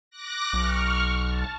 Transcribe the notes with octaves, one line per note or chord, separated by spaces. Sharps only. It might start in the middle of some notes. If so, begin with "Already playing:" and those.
D6 F#6 A#6
B1 C#6 F6
A5